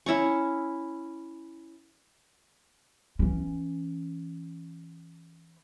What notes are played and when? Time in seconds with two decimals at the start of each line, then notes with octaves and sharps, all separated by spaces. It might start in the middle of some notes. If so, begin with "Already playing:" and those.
0.06 C#4 E4 A#5 C#6
3.19 E3 C#4